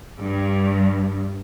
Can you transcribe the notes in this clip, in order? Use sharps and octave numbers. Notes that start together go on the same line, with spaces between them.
G2